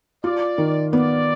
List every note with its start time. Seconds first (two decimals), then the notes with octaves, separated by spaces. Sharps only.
0.24 F4 D5
0.58 D#3
0.93 B3 D5